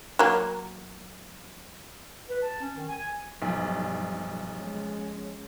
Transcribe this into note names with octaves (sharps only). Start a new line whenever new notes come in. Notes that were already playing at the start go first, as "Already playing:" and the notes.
F#3 A#3
B4
A5
C#4
D#3
G#5
B1 G2 F3 G3 A3 G#5
G#3 C#4